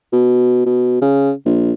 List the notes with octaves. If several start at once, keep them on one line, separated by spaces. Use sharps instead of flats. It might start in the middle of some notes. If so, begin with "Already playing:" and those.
B2
B2
C#3
A#1